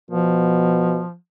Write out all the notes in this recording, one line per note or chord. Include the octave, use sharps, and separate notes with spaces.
B2 F3